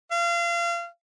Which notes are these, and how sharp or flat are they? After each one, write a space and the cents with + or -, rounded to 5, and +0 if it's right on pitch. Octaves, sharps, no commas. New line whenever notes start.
F5 -30